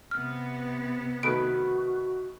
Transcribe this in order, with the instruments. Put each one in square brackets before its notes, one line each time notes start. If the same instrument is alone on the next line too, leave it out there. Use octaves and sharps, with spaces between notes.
[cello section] C3 B3 [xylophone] F6
[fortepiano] D#3 A3 B4 [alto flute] F#4 [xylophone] D7